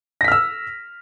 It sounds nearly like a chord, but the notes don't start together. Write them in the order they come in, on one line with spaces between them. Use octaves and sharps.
A#6 B6 F6 E6